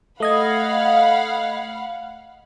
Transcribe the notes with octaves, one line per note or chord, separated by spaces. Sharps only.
A3 D#5 F5 F#5 B5 G#6